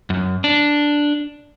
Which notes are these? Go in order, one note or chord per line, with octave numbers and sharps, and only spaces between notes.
F#2
D4